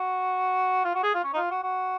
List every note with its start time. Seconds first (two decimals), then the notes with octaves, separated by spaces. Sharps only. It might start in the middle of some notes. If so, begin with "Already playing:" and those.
Already playing: F#4
0.85 F4
0.95 F#4
1.04 G#4
1.14 F4
1.24 C#4
1.34 D#4
1.37 F4
1.51 F#4
1.63 F#4